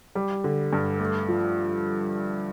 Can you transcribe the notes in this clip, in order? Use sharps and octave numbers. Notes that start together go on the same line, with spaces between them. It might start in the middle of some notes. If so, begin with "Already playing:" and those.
G3
D3
G2
A3
F3